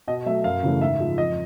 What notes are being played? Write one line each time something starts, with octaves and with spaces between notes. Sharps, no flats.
B2 D#5
F#3 A3 E5
F#2 F5
C#3 E3 A3
G#2 E5
F3 G#3
F2 D#5